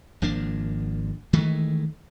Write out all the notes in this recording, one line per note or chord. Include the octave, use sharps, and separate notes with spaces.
G#1 F3 A#3 D4
D#3 E3 G#3 A3